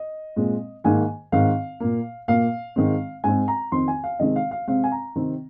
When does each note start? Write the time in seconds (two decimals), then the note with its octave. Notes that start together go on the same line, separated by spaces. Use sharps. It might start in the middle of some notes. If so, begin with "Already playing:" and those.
Already playing: D#5
0.36 A#2 G#3 C4
0.84 G#2 D#3 A#3 G#5
1.32 G#2 D#3 C4 F5
1.80 A#2 A#3
2.28 A#2 A#3 F5
2.76 G#2 D#3 G#3 C4
3.24 G#2 G#3 C4 G#5
3.48 A#5
3.72 F2 D#3 C4 C6
3.88 G#5
4.04 F5
4.19 C3 D#3 G#3 C4 D#5
4.36 F5
4.51 F5
4.67 C3 G#3 C4 F5
4.84 G#5
4.92 A#5
5.16 C3 D#3 C4